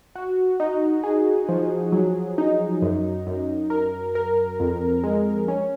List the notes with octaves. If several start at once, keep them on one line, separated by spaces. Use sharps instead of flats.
F#4
D#4
G#4
F3
F#3
D#4
F#2
F#2
A#4
A#4
F2
G#3
C#4